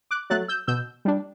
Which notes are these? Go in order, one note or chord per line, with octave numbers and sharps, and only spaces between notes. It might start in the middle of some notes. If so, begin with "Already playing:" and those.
D6 F#6
F#3 A3 F#6 A6
E6 G6
B2 E6 G6
G3 D4